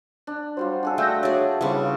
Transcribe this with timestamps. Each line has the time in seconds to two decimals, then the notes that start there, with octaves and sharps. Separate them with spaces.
0.27 D4
0.57 F#3 G3 F4 C5
0.83 D4 G#4 A4
0.98 A3 D4 G5 E6 G6 A#6
1.23 F#4 G#4 C#5 D5
1.61 C#3 E3 F3 G3